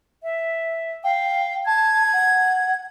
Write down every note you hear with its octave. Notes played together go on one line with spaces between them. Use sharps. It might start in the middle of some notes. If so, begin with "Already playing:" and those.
E5
F5 G5
A5 G#6
F#5